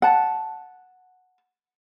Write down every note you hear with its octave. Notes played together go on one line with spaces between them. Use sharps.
F#5 A5